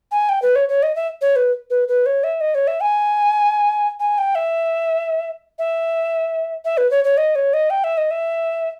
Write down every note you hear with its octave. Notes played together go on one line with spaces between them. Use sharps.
G#5
G5
B4
C#5
C#5
D#5
E5
C#5
B4
B4
B4
C#5
E5
D#5
C#5
E5
G#5
G#5
G5
E5
E5
E5
B4
C#5
C#5
D#5
C#5
D#5
G5
E5
D#5
E5